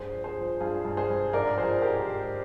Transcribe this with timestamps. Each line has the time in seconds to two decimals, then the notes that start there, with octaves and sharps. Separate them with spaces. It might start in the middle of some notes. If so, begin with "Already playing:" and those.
Already playing: G2 G#4 C5
0.12 F3
0.24 G#4 C5
0.37 F3
0.60 G2 F4 G#4
0.85 G2
0.97 G#4 C5
1.10 G2
1.33 G#2 A#4 D5
1.58 F3 G#4 C5
1.82 G#2 G4 A#4
2.07 G#2